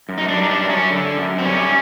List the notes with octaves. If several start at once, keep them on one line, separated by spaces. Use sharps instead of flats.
F#2
D#4
D4
G3
D#4
D4
F#2
C#4
D3
F#2
C4
G3 C#4